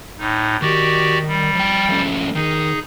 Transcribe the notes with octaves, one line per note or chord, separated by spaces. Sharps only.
A2 D#4
D#3 F#4 G4 D5
G3
F3 G5
F3 A3 C#4
D#3 D#4 G#4